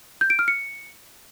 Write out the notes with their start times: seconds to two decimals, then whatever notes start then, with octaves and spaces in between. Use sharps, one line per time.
0.21 G6
0.30 D7
0.39 F6
0.48 C#7